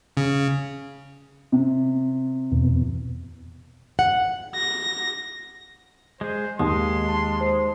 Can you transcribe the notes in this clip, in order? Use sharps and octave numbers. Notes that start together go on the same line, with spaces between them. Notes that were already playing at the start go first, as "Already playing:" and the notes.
C#3
C3
E2 B2
F#5
A#6
G#3 G#4 C5
D#2 D#3 G#3 C6 D#6
A5
C5